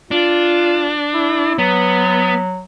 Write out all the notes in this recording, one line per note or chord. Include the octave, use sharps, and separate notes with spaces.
D4 F4
E4
F#3 B3